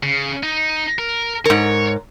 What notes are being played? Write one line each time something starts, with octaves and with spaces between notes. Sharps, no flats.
C#3
D#4
A#4
G#2 A#4 C#5